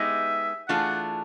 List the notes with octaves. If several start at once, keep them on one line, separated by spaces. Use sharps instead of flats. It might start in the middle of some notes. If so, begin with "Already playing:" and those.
Already playing: G#3 B3 D#4 G4 E5
E3 A3 D4 F4 G#4 F#5